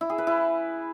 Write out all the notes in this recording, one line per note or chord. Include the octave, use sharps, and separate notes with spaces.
E4
G#4
B4
E4